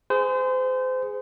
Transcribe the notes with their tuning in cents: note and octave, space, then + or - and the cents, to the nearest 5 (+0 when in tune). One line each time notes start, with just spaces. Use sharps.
G#4 +0 C5 -30